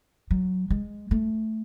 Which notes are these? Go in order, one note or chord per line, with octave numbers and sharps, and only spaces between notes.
F#3
G#3
A3